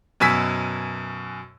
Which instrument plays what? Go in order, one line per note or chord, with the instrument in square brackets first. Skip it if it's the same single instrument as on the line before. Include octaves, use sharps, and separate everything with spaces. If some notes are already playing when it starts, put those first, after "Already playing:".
[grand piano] F#2 B2 G#5 E6 B6